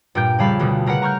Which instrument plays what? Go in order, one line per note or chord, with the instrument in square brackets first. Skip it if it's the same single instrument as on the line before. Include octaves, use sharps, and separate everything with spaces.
[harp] G2 A#2 A#4 G5 G6
F2 C#3 G3 F5 A5 B5
D2 B2 D3 G3
C#3 A#4 B4 F#5
A#5 C#6 F6 G6